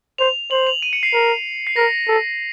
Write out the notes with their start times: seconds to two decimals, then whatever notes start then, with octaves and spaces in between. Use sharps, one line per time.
0.18 C5 F7
0.51 C5 F#7
0.67 F7
0.82 D#7
0.93 C#7
1.03 C7
1.13 A#4
1.67 C7
1.76 A#4 A#6
2.08 A4